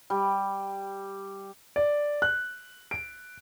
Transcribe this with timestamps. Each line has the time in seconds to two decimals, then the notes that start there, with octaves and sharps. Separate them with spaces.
0.10 G3
1.76 D5
2.22 F#6
2.91 D7